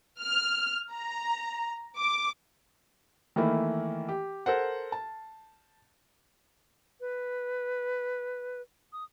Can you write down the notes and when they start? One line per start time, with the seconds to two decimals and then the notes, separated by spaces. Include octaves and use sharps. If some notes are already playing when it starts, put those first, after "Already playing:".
0.22 F6
0.94 A#5
1.99 D6
3.36 D#3 E3 A3 A#3 E4
4.09 G4
4.46 A4 A#4 C5 F#5
4.92 A5
7.00 B4
8.93 D#6